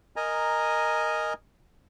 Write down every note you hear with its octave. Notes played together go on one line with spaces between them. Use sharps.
A#4 D#5 G#5 A#5